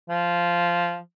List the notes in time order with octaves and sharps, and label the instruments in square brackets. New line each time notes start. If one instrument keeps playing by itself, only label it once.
[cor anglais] F3